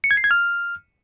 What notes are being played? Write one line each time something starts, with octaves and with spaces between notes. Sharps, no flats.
C#7
G#6
C7
G#6
F6